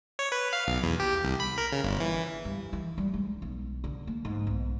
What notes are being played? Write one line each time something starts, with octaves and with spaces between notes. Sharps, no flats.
C#5
B4
F5
B1
E2
G4
C2
B5
A#4
C#3
G1
E3
G2
E3
G3
G#3
B1
D3
A#3
G#2
B1